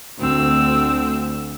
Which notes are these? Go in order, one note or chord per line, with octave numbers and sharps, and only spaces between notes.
D2 C4 E6